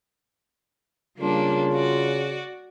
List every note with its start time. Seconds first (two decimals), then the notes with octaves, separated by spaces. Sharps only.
1.19 C#3 G3 A#3 D4 F4
1.73 F#4 D5